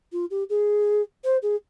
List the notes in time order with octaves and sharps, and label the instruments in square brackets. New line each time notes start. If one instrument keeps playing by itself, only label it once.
[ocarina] F4
G4
G#4
C5
G#4